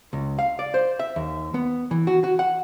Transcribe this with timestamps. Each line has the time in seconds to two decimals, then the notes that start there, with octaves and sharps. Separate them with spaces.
0.13 C#2
0.39 F5
0.59 D5
0.74 C5
0.99 E5
1.16 D#2
1.54 B3
1.91 E3
2.07 F#4
2.24 F#4
2.39 F#5